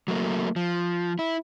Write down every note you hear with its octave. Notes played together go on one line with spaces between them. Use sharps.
F#3 A3 A#3
F3
E4